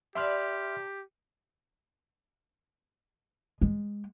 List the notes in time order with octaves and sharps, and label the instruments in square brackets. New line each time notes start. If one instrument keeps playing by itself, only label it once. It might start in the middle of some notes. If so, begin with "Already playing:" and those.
[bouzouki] D4 B4 [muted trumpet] G4 [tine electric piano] E5 C6 F6
[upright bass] G#3